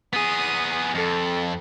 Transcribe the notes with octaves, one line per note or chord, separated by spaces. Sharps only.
B3 G#4 D#6
F2 A4